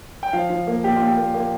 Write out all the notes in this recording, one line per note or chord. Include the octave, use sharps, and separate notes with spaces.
G5
F3 F5
F3
A#3
A#2 G4
A#2 F4
G4
A#3
A#3